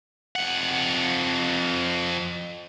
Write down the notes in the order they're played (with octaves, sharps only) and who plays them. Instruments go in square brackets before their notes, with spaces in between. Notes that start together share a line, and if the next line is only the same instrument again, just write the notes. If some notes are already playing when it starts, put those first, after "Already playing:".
[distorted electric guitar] F2 F#5